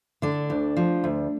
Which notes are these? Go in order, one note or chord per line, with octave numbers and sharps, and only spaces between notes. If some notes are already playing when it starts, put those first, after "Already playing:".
D3 D4
D2
F3
D2